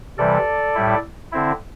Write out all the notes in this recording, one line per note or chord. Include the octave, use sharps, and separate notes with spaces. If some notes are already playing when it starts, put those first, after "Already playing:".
C3 E3 G3 A4 D5
A2 G3 E4
D3 C4 E4